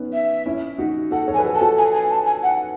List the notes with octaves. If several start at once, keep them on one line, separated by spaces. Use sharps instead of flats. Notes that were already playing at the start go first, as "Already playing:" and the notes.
Already playing: B3 C#4 D#4
E5
C#4 E4
D#4 F#4
F#4 A4 F#5
A4 C#5
G#5
B4
F#4 A4
A5
F#4 A4
G#5
G#5
A5
G#5
F#5